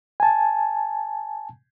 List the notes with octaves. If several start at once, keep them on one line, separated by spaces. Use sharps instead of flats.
G#5 A5